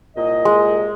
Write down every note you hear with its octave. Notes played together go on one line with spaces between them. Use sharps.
C2 A#2 D#5
G#3